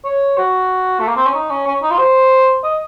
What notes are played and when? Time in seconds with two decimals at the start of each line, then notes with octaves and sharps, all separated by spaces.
0.05 C#5
0.37 F#4
1.00 A3
1.08 A#3
1.16 C4
1.26 C#4
1.34 D#4
1.50 C#4
1.66 C#4
1.83 D#4
1.91 F4
1.98 C5
2.63 D#5